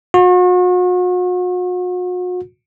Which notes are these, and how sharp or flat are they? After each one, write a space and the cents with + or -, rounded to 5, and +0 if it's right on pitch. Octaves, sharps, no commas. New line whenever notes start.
F#4 -40